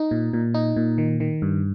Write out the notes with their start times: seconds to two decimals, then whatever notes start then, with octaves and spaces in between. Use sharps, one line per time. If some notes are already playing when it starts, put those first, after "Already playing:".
Already playing: D#4
0.11 A#2
0.33 A#2
0.54 D#4
0.76 A#2
0.98 D#3
1.20 D#3
1.42 G2